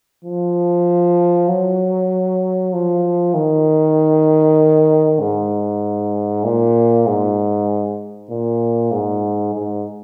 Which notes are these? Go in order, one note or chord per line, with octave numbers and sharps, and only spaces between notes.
F3
F#3
F3
D#3
G#2
A#2
G#2
A#2
G#2
G#2